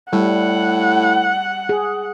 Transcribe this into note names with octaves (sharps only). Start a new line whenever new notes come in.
A2 G3 F#5
G#4